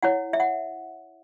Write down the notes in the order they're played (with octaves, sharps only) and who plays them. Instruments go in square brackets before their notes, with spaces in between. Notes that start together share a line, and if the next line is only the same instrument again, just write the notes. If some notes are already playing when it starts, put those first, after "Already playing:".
[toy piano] E4 C#5 F#5
E5
F#5